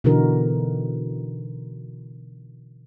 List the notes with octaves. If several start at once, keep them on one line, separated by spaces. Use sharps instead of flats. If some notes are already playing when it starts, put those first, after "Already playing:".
B2 D3 E3 D#4 F#4 A#4